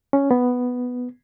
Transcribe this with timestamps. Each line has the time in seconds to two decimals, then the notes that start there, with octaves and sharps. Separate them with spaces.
0.13 C#4
0.31 B3